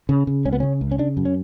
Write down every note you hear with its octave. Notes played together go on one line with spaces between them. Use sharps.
C#3
C#3
C#2 C#4
B3
C#3 C#4
C#2
C#4
C#3 D4
F#2
C#4